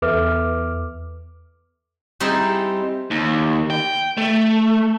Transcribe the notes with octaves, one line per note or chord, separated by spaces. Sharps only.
E2 A4 B4 E5 D6 F6
G3 C4 D#4 E4 G#4
D#2
G5
A3